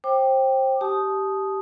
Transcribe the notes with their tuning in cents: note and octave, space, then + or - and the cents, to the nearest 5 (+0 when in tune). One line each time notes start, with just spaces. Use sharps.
C5 +25 G5 +0 D6 +20
G4 -10 A5 -35 D#6 +0